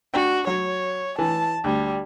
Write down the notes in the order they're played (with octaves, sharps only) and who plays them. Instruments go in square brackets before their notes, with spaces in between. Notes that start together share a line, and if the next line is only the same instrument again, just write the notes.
[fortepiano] D4 G5 [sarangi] F#4
[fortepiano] F#3 [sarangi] C#5
[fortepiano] E3 [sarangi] A5
[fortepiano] D2 [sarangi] G3